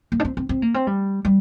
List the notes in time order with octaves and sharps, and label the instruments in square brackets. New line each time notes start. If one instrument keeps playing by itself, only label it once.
[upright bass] A#3
D4
C4
C4
C4
A#3
C4
G3
G3